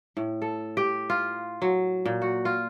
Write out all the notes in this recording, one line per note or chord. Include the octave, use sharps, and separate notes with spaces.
A2
A4
G4
F4
F#3
A#2
F#4
F4